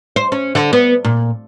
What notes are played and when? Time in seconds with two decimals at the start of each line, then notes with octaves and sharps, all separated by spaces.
0.16 C5
0.32 C#4
0.55 D3
0.73 B3
1.05 A#2